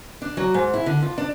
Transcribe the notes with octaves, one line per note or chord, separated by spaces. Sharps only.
D4
F#3
G#2
E4
D3
F4
D4